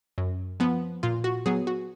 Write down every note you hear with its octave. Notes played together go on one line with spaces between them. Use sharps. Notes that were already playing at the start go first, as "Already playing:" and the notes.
F#2
F3 B3
A#2 F4
F#4
F#3 B3 G#4
F#4